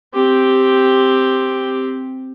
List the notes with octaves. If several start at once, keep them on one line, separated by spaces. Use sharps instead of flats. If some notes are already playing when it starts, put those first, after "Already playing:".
C4 G4